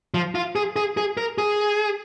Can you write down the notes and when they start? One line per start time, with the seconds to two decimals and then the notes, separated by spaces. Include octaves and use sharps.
0.14 F3
0.35 F4
0.56 G#4
0.76 G#4
0.97 G#4
1.17 A#4
1.38 G#4